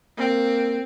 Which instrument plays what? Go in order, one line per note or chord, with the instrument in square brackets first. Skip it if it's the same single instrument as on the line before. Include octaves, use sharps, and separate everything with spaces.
[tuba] A#3 [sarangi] C4